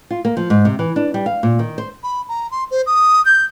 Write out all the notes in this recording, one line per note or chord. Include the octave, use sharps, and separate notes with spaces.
F4
A#3
F3
G#2
C3
E3
D4
G3
F5
A#2
D#3
C5
B5
A#5
C6
C5
D#6
G6